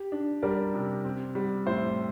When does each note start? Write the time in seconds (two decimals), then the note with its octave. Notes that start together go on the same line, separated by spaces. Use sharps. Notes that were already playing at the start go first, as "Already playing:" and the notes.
Already playing: G4
0.12 D4
0.42 G3 A#4 D5
0.74 C3
1.04 C4
1.35 G3
1.66 A2 C5 E5